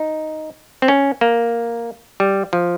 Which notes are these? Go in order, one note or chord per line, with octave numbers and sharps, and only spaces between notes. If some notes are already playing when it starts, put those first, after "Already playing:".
Already playing: D#4
C4
C#4
A#3
G3
F3